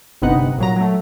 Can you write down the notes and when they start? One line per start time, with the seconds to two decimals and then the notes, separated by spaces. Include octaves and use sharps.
0.22 G1 C3 B3 D#4 F#5
0.58 A#2 F#3 A#5
0.76 F#3 A3